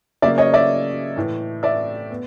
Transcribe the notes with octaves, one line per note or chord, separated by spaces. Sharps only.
C#3 F#3 A#3 D5 E5
C#5 D#5
D5 E5
A2 E3 A3
D5 E5
B3